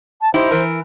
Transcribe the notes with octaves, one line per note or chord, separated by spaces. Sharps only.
A5
D#4 E4 G4 C5
E3 A#4